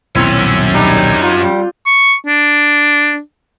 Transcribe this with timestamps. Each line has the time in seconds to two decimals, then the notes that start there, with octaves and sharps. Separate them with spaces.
0.15 D#1 B1 F#2 C4 C#4 E4
0.74 G3 D4 D#4
0.97 G5
1.23 D#4 F4
1.39 G3
1.86 C#6
2.26 D4